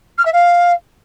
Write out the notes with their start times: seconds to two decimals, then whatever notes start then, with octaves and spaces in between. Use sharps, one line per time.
0.18 F6
0.25 E5
0.33 F5